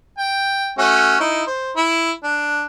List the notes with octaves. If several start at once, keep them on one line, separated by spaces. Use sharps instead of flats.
G5
A3 C#4 F#4
D#4 E4
C5
E4
D4